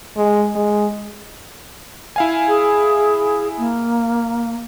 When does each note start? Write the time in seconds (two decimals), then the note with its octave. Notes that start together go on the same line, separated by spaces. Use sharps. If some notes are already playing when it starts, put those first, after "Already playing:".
0.16 G#3
0.55 G#3
2.16 E4 F5 G#5
2.48 G#4
3.58 A#3